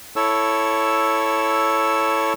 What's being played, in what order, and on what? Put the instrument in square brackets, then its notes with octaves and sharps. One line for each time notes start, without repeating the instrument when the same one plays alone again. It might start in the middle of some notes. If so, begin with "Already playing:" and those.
[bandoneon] E4 A4 C#5 E6